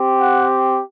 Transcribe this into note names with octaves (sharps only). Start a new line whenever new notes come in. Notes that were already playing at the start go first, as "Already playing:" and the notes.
Already playing: C4 G4
F#5